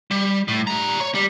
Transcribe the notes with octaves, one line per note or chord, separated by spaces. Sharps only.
G3
A2
G3 A#5
C#5
G3